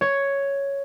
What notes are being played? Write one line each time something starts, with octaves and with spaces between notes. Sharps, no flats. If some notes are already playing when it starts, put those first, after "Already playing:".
C#5